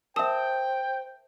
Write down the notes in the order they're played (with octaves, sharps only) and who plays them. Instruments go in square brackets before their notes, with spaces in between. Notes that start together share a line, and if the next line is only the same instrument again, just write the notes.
[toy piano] A#4 E5 [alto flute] C5 [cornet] G5 [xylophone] A5 D#6